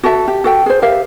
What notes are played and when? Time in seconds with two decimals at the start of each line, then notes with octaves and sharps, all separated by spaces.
0.04 F#4 A4 E5
0.28 G4
0.44 F#4 A4 G5
0.66 G#4 C5
0.82 G4 A#4 E5 F5